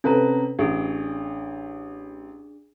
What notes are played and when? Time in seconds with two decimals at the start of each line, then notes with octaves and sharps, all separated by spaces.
0.04 C3 C#4 A4 B4 A#5
0.59 A1 D4 G#4